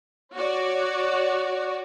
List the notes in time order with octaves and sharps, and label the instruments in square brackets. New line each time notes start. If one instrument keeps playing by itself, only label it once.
[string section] F#4 C#5 D5